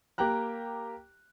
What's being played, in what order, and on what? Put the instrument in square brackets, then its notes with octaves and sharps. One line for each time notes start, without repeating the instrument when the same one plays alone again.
[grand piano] A#3 G4 G5 A#5 F#6